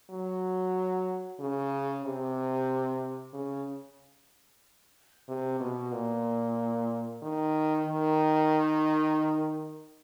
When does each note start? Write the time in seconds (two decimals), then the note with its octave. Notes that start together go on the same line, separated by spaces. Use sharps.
0.11 F#3
1.40 C#3
2.05 C3
3.33 C#3
5.29 C3
5.60 B2
5.92 A#2
7.23 D#3
7.87 D#3